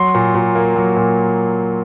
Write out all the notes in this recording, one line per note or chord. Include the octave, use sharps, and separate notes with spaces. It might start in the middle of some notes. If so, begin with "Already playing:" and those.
Already playing: F#3 C6
A#2
A#2
A#3
F#3
A#2